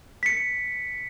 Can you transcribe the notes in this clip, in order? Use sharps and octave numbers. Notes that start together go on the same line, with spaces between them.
B6 C#7